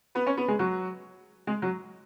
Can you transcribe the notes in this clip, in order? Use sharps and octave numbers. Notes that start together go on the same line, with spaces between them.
B3 B4
C#4 C#5
B3 B4
G#3 G#4
F#3 F#4
G#3 G#4
F#3 F#4